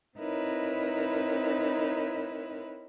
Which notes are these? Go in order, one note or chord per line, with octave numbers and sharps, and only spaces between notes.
C4 D#4 E4 A#4 B4 C#5